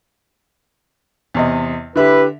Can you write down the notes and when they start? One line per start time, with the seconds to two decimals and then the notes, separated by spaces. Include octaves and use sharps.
1.34 E2 C3 D#5
1.96 D3 E4 G4 B4 E5